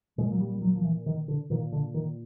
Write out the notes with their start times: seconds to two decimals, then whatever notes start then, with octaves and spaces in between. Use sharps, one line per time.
0.18 A#2 G#3
0.32 F#3
0.40 G3
0.55 G3
0.62 F#3
0.76 F3
0.84 E3
1.06 D#3
1.28 D3
1.50 A#2 D#3
1.72 D3
1.94 D#3